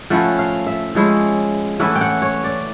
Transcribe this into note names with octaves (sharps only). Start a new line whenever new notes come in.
F3 A3 C#4 E4 F#5
F5
E5
F3 G#3 C#4 E4
E3 A3 C#4 E4 F#5
G5
F#5
C#5
D5